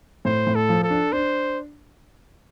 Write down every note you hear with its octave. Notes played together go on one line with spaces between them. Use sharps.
A2 C5
A2
A4
F3
A4
D4
D4 C5